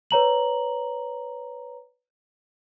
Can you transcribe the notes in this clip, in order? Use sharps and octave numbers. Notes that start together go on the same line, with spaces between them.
B4 C#5 A#5 F#7